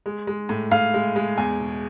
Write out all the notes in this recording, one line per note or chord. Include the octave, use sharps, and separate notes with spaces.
G#3
G#3
A2
A2 F5
G#3
G#3
E2 G#5
B2